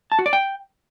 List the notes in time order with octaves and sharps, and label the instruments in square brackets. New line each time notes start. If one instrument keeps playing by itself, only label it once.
[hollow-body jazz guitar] A5
F#4
D5
G5